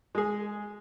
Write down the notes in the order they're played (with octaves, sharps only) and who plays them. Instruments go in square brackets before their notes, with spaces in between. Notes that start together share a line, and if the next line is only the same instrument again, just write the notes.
[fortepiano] G#3 G#4